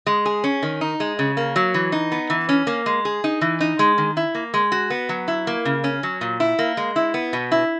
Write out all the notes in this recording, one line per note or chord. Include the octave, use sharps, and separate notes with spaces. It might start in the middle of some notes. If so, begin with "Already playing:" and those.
G#3
G#4
C#4
D#3
D#4
G#3
C#3
A#3
F#3
E3
D#4
B3
E3
C#4
A#3
G#3
G#4
D#4
E3
D#4
G#3
D#3
E4
A#3
G#3
F#4
B3
F#3
E4
A#3
C#3
C#4
F#3
A#2
E4
A#3
G#3
E4
B3
B2
E4